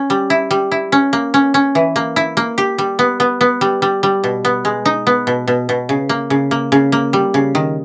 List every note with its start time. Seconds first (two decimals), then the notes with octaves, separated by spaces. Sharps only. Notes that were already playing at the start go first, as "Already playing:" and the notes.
Already playing: C#4
0.10 G3
0.30 E4
0.51 G3
0.71 E4
0.92 C#4
1.13 A#3
1.34 C#4
1.54 C#4
1.75 E3
1.96 A#3
2.16 E4
2.37 A#3
2.58 G4
2.78 G3
2.99 B3
3.20 B3
3.41 B3
3.61 G3
3.82 G3
4.03 G3
4.24 B2
4.45 B3
4.65 G#3
4.85 D#4
5.07 B3
5.27 B2
5.47 B2
5.69 B2
5.89 C#3
6.09 A#3
6.30 C#3
6.51 A#3
6.72 C#3
6.92 A#3
7.13 G3
7.34 C#3
7.55 D#3